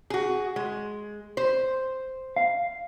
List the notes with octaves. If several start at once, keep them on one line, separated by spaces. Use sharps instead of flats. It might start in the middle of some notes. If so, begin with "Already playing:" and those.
F#4 G#4
G#3
C5
F5